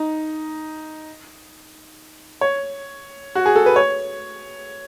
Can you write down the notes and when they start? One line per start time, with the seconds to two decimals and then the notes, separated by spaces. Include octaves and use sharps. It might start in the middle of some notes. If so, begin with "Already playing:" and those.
Already playing: D#4
2.41 C#5
3.35 F#4
3.46 G#4
3.56 A4
3.66 B4
3.76 C#5